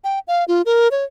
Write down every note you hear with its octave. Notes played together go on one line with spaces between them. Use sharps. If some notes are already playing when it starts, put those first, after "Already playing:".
G5
F5
F4
A#4
C#5